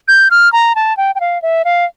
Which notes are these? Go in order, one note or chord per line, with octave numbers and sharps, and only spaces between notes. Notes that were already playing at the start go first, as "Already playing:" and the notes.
G6
F6
A#5
A5
G5
G5
F5
E5
F5